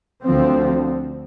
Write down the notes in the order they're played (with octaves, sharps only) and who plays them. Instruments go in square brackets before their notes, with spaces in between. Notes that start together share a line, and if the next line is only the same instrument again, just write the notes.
[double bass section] D2 D3 F3 C4